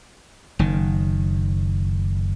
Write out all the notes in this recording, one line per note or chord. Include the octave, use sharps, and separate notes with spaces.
F#1 D#3